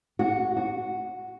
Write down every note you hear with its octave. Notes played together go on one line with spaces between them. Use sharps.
F#4
F#4